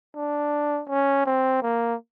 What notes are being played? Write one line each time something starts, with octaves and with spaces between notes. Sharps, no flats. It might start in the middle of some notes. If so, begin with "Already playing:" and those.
D4
C#4
C4
A#3